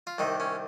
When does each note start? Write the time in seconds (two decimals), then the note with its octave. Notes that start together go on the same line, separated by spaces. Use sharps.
0.07 F4
0.18 C2 C3 D#3 D#4
0.40 C#4